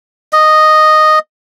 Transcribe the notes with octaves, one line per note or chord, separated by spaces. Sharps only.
D#5